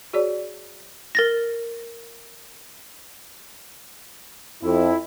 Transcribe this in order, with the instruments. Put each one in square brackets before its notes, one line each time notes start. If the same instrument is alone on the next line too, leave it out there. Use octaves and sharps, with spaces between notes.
[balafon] F#4 G#4 C#5 D5
[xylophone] A#4 A6 A#6
[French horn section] F2 [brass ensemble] E4